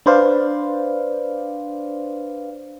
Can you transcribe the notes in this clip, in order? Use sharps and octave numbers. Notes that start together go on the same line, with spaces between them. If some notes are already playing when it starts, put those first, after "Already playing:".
D4 B4 C5 D5 F5